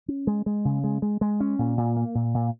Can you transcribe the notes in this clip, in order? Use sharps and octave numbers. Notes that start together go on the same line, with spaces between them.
C#4
G#3
G#3
C#3
G#3
G#3
G#3
C#4
A#2
A#2
A#3
A#2
A#2